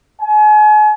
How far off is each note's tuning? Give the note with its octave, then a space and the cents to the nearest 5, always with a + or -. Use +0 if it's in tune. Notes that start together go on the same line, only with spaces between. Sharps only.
G#5 +40